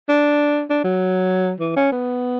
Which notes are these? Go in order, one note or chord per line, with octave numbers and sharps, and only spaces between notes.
D4
D4
F#3
E3
C#4
B3